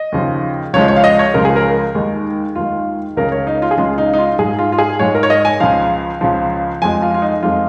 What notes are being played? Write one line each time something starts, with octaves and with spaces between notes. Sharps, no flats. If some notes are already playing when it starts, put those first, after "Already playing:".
Already playing: D#5
D#2 C#3 F3
C#2 C#3 F3 G#3 C#5
C#5
F5
D#5
C#5
C#2 C#3 F3 G#3 A#4
G#4
A#4
D#2 D#3 G#3
D#2 D#3 G#3 F4
C#2 C#3 G#3 A#4
C#5
D#4
F4
G#4
C#2 C#3 G#3 F4
D#4
D#4
F4
G#2 G#3 G#4
F4
F4
G#4
G#2 G#3 C#5
A#4
C#5
D#5
G#5
C#2 C#3 F3 F5
C#2 C#3 F3
F2 F3 G#3 G#5
F4
F4
D#4
F2 F3 G#3 F4